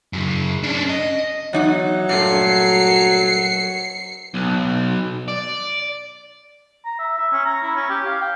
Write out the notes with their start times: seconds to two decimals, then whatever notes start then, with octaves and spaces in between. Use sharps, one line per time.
0.13 F#2 C#3
0.63 C#4 D4
0.90 D#5
1.53 E2 F#3 D#4 F#5
2.09 G2 A#2 A3 C7 C#7
4.34 B1
5.28 D5
6.85 A#5
6.99 E5
7.18 E5
7.33 C#4
7.46 A#5
7.62 E4
7.75 C#4
7.90 G4
8.06 F5
8.21 G5